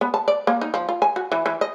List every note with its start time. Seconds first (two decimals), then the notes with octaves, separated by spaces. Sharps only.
0.01 B3
0.14 A5
0.28 D5
0.47 A#3
0.61 D#4
0.74 F3
0.89 F4
1.02 G#5
1.16 F#4
1.32 E3
1.46 E3
1.61 D#5